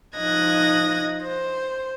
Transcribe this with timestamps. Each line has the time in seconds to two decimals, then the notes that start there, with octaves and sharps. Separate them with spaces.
0.17 F3 D#4 D#5 F#6 G#6 A#6
1.23 C5